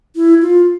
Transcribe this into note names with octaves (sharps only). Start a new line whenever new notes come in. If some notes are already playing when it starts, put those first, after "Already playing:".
E4
F4